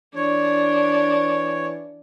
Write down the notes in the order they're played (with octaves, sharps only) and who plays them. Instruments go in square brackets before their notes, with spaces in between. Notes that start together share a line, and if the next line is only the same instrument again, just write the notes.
[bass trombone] E3 [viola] D4 [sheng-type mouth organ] C#5